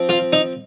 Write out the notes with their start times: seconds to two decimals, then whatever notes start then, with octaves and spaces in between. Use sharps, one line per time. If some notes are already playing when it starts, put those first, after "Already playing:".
Already playing: F3 C4
0.09 F4
0.33 D#4